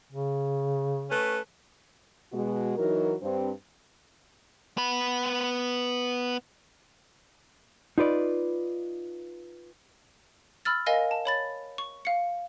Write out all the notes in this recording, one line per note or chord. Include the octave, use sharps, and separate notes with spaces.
C#3
A3 C#4 B4
B2 G#3 F#4
E3 F#3 D#4 F#4 A#4
G2 C4
B3 B5
D#4 F4 B4 D5
B5 E6 F6 A6
A#4 D#5 F5 G#5 A#6
A5
C#5 B5 A6
C#6
F5 C#7